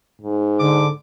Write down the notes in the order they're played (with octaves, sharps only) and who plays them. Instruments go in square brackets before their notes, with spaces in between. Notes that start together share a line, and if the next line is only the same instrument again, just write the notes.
[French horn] G#2
[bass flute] D3 [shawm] D6